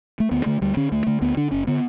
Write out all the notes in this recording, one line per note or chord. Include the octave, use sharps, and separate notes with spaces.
A3
D2 B3
D3 A3
D2 G3
D3 C#4
D2 A3
D3 A3
D2 B3
D3 D4
F#1 C#4
D3 B3